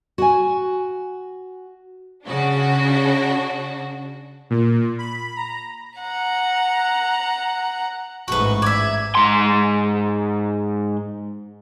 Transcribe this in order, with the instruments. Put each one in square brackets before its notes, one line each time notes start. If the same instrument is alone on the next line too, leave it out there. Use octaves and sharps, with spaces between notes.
[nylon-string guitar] F#4 G#5
[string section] C#3 D4 F#4
[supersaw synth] A#2
B5
A#5
[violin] F#5 A#5
[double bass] A1 G#2 [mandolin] F#4 B4 [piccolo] C#6
[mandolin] D5 E5 [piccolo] G#6
[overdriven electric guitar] G#2 C6